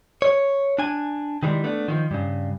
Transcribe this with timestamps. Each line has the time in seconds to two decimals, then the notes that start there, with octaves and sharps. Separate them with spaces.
0.22 C#5
0.78 D4 G#5
1.43 D#3 E3 G3 G#3
1.64 A3 B3 D4
1.88 D#3 F3
2.11 G2 C#3